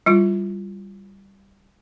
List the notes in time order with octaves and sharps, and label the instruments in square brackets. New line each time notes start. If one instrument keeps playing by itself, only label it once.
[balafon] G3 E4 F4